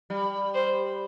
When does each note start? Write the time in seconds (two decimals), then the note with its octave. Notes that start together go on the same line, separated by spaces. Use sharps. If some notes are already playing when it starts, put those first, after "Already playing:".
0.10 G3
0.54 C5